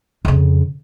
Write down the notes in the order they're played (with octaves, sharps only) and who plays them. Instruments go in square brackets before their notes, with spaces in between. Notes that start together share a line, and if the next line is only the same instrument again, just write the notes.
[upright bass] F2 C#3